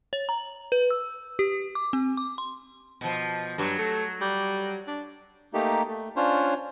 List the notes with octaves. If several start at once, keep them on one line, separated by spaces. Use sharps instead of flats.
C#5
A#5
B4
E6
G4
D6
C4
D6
C6
B2 F3
G2 F#3
A3
G3
D4
A3 A#3 D#4 G4
A3
C#4 D4 F4 C5 C#5